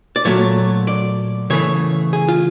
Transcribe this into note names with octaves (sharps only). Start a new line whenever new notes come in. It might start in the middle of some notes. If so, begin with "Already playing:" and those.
D5
A#2 F#3 A3 C#5
D5
C#3 E3 A3 C#5
G#4
F4